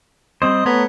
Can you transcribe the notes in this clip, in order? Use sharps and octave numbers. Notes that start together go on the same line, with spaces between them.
G3 C4 C5 D#5
A3 B3 C#5 A#5